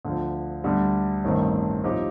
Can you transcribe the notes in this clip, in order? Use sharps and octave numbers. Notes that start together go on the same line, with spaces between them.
D2 D3 F3
D2 D3 G3
A1 G2 D#3 A3 C4
A2 F3 C4 D#4 G4